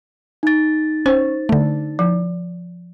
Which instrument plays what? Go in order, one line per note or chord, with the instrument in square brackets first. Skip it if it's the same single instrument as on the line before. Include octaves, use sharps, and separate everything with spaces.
[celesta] D#4 A6
[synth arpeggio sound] C#4 [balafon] C5
[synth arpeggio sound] D3 A3
[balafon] F3